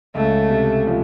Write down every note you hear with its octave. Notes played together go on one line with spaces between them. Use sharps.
C#2 A3
C3
F3